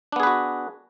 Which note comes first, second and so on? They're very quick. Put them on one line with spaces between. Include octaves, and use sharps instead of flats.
D4 B3 G#4 B4 F#4